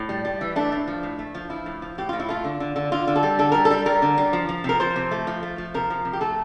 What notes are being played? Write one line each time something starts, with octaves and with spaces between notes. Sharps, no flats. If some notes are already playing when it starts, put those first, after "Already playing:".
Already playing: A2
G3
G3
E3
A3 D4
A2
F3
A2
A3
F3
F3 E4
A2
F3
A2 G4
A2 F4
E4
A3 F4
D3
D3
D3
D3 F4
D3
A4
G3
D3 A4
G3 A#4
A4
G3
G3 A#4
D3
G3
F3
F3
C3 A#4
F3 C5
C3
A3
F3
A3
F3
C3 A#4
F3
C3
G4
A3 A4